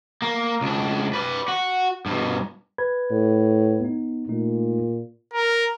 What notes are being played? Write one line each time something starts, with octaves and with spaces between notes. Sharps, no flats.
A#3
C#2 D4
B4 D5
F#4
G2 B2
B4 B5 G#6
A2
B3 D#4
A#2 A3 D#4
A#4